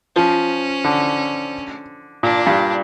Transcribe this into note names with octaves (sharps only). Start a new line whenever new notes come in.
F3 C#4
D3
A#2 D4
G2